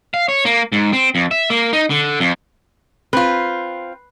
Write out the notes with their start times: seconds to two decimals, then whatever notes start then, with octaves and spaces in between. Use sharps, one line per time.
0.14 F5
0.29 C#5
0.45 A#3
0.72 G#2
0.93 C4
1.15 F2
1.31 E5
1.50 A#3
1.73 D#4
1.90 D3
2.20 F2
3.13 C4 F4 B4